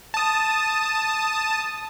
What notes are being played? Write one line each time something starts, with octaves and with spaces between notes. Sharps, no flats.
A5 D#6